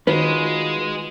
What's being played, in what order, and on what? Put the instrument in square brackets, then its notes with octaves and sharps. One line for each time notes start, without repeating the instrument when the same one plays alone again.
[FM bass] D#3 [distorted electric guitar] G#3 [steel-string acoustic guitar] D#4 F4 F#4 [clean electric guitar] B4